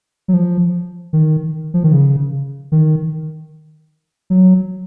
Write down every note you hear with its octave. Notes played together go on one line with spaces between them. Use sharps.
F#3
F3
D#3
F3
D#3
C#3
D#3
F#3